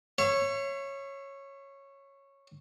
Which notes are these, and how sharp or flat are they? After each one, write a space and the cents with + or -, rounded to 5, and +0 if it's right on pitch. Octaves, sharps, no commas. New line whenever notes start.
C#5 -10 E5 +40